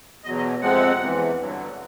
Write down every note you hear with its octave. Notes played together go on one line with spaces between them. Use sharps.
E2 B2 F#3 D#5
D#5
F2 C3 F3 G#3 C4 F#5
E2 C3 E3
G2 D3 F#3